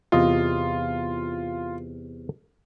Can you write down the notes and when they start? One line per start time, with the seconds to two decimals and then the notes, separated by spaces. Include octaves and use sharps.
0.12 E2 C3 F4 D#5